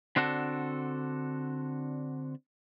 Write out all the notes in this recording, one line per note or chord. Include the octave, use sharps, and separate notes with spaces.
D3 C4 D4 F#4 A4